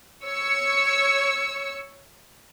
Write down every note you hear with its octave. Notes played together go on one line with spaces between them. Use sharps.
C#5 E6 C#7